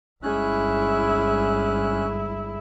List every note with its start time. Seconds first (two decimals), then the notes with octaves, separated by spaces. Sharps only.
0.23 G1 G#3 C#4 E4 F#6